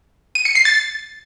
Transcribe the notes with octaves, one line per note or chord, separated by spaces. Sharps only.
D#7
C#7
C7
A6